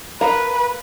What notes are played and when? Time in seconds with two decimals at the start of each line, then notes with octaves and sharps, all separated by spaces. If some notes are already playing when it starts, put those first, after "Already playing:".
0.21 A#4 B4 F5 A#5